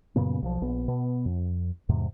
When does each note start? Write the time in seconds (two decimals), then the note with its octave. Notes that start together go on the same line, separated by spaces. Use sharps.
0.16 F#2 A#2 C#3 B3
0.42 B1 F3
0.62 A#1 B3
0.88 B2 B3
1.26 F2
1.89 E2 G#2 C3